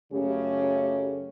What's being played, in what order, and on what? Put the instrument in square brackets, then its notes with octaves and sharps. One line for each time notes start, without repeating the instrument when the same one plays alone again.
[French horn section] F#2 C#3 A3 C#4 G4